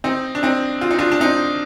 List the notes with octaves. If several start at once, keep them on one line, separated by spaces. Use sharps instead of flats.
C4 D#4
D4
C4 D#4
F4
D#4
D4 F4
D4
C4 D#4